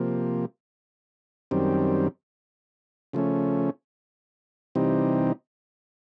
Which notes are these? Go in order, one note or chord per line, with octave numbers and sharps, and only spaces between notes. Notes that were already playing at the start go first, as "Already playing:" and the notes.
Already playing: C3 F3 A#3
F#2 D#3 G3 C4
C#3 F3 A3 C#4
C3 E3 G3 C4 D#4